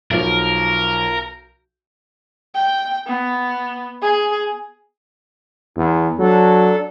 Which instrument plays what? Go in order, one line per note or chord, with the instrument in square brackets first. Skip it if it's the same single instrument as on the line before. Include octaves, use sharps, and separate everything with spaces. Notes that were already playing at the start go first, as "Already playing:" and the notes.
[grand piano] B1 F3 [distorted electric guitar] A#4
[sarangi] G5
B3
G#4
[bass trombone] E2
[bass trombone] F#3 [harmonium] D4 A4